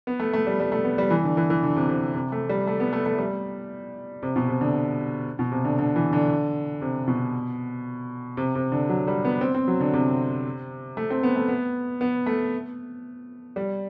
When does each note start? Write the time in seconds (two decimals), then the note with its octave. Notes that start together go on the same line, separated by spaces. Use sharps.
0.07 B3
0.20 A3
0.33 A3
0.47 G3
0.60 G3
0.72 A3
0.84 B3
0.98 G3
1.10 E3
1.24 D3
1.37 E3
1.50 E3
1.63 D3
1.76 C3
1.89 C3
2.14 C3
2.32 A3
2.49 G3
2.67 A3
2.80 B3
2.93 A3
3.06 A3
3.18 G3
4.23 C3
4.36 B2
4.48 C3
4.61 D3
5.39 B2
5.52 C3
5.65 D3
5.79 D3
5.96 E3
6.13 D3
6.82 C3
7.07 B2
8.37 C3
8.55 C3
8.72 D3
8.89 F#3
9.07 G3
9.25 B3
9.41 C4
9.55 C4
9.68 F#3
9.80 D3
9.93 C3
10.97 A3
11.10 C4
11.23 B3
11.36 A3
11.48 B3
12.01 B3
12.26 A3
13.56 G3